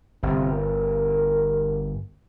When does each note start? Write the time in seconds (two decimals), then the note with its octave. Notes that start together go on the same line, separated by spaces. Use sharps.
0.23 G1 C3
0.52 A#4